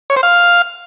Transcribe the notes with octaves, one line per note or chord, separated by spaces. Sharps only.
C#5
C5
F5